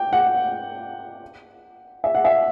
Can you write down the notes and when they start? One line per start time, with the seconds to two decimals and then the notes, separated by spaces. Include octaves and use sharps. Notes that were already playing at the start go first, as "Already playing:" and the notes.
Already playing: G5
0.13 F#5
2.04 E5
2.15 F#5
2.25 E5